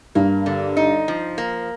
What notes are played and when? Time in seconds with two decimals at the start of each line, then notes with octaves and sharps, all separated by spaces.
0.15 G2 A#3
0.46 D3
0.77 D#4
1.08 F3
1.38 A#3